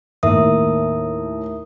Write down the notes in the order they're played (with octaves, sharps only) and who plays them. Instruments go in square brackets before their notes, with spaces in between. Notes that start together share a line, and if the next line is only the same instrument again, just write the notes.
[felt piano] D#2 A2 [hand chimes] A#4 E5 D#6